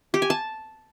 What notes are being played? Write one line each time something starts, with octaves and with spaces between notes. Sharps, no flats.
G4
G#5
A5